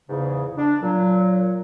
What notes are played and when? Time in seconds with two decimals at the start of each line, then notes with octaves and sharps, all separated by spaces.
0.09 E2 G#2 C#3
0.58 D4
0.82 A#2 F#3